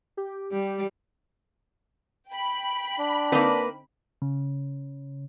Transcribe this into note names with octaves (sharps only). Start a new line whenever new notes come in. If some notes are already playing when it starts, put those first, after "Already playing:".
G4
G3
G5 B5
D4
D3 A#3 C4 D#4 B4
C#3